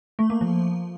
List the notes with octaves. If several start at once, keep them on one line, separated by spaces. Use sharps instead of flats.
A3
A#3
F3